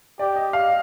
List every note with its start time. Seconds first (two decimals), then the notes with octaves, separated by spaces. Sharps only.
0.19 G4 D5
0.36 D#5
0.53 F5